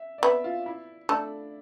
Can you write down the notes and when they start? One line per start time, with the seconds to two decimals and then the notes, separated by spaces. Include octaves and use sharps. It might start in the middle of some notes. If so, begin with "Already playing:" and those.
Already playing: E5
0.18 D5
0.23 B3 E5
0.44 F4
0.66 E4
1.09 A3 D4 A4